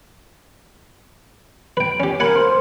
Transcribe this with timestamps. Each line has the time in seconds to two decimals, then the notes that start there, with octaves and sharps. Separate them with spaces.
1.77 B4 G5
2.00 C#4 G4
2.20 A#4 F#5 G#5 B5
2.36 C5